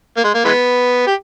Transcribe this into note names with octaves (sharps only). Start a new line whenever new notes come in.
A#3
G#3
A#3
E3 G#3 B3
G4